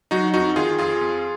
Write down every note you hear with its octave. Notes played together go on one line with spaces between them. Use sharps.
F#3 D#4 F#4
F2 D#4 F#4
D#3 F4 G#4
F2 F4 G#4
F2